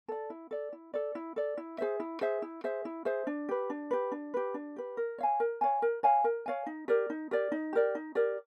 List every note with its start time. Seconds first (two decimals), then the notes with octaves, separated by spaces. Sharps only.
0.08 A4 D5
0.30 E4
0.51 A4 D5
0.73 E4
0.94 A4 D5
1.15 E4
1.36 A4 D5
1.57 E4
1.78 G#4 C5 E5
2.00 E4
2.21 G#4 C5 E5
2.42 E4
2.64 G#4 C5 E5
2.85 E4
3.05 G#4 C5 E5
3.27 D4
3.49 G4 B4
3.70 D4
3.91 G4 B4
4.12 D4
4.34 G4 B4
4.54 D4
4.76 G4 B4
4.97 A#4
5.18 C#5 F5 G#5
5.40 A#4
5.61 C#5 F5 G#5
5.82 A#4
6.03 C#5 F5 G#5
6.24 A#4
6.46 C#5 F5 G#5
6.66 D#4
6.88 G4 A#4 D5
7.10 D#4
7.31 G4 A#4 D5
7.52 D#4
7.73 G4 A#4 D5
7.95 D#4
8.15 G4 A#4 D5